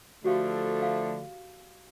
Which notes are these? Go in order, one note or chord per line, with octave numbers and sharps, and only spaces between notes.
D3 F3 A3 F#4 G4 F5
F5